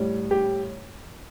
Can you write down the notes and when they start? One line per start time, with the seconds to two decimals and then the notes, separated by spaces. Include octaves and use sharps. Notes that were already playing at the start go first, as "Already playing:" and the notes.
Already playing: A2 G3
0.31 G4